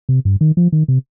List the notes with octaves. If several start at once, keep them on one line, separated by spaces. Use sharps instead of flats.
C3
G2
D#3
F3
D#3
C3